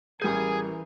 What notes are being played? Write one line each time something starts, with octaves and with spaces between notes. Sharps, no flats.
A1 E3 G3 G#4 A#4 G#5 G6